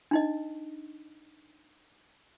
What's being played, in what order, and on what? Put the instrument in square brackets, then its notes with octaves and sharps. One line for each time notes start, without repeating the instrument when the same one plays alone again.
[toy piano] D4 D#4 D#5